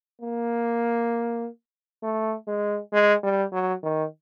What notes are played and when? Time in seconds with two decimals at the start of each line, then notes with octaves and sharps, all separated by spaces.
0.21 A#3
2.03 A3
2.47 G#3
2.93 G#3
3.23 G3
3.52 F#3
3.83 D#3